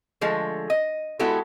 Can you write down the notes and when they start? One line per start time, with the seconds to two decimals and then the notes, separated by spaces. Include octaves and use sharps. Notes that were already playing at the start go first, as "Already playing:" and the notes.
0.21 D3 F3 G#3 A3
0.70 D#5
1.19 G#3 B3 E4 F#4 G4 A4